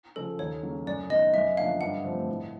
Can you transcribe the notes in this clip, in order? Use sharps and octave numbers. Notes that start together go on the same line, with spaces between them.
C#3 F3 A4
D#2 C#5
C#3 F#3 A#3
F#2 D5
D#3 F#3 B3 D#5
F#2 E5
D3 F3 A#3 D4 F5
G2 F#5
D3 F3 A3 C4
A2